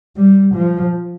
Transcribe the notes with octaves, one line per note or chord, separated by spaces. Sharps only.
G3
F3